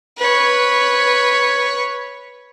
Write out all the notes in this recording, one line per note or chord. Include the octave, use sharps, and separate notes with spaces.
B4 C#5